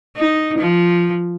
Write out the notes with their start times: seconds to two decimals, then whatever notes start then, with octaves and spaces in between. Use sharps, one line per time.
0.16 D#4
0.59 F3